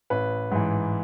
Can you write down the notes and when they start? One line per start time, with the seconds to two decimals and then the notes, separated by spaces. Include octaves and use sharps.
0.10 A1 B4
0.51 G#2 E3